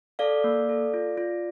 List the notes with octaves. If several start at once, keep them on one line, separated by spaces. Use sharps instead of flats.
A4 D5 F5
A#3
A4
F4
F4